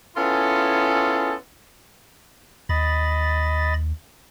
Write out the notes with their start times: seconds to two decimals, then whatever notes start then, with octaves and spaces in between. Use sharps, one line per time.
0.17 B3 C#4 E4 F4 G#4 A4
2.69 D#2 D#5 B5 A6